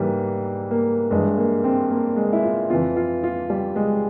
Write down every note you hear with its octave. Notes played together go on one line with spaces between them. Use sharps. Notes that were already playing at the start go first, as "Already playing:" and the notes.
Already playing: G#2 E3 G3 A#3
A#3
G2 E3 G#3
A#3
C4
A#3
G#3
E4
F4
F2 E3 F4
F4
F4
G3
G#3